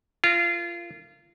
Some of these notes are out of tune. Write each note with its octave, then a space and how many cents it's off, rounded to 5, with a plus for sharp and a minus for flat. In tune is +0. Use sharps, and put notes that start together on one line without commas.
F4 -25 A#4 -25